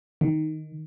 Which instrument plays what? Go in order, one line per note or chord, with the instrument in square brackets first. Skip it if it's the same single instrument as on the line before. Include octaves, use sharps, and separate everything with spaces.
[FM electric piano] D#3